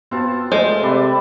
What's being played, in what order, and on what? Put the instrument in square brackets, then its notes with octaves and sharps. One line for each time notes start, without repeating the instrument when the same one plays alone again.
[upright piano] B3 F#4 [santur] C4 F4 A5
[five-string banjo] G#3 C5 [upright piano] A3
[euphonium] C3 [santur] B4 D5 E5